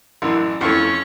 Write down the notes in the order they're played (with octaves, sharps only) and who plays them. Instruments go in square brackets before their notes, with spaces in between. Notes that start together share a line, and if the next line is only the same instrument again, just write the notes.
[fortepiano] A1 F#2 E3
[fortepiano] F2 E3 A3 [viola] C#4 C#6